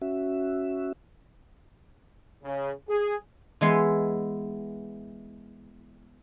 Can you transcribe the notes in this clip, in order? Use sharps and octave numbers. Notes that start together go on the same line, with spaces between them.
C#4 F#4 E5
C#3
G#4
E3 G#3 B3 C6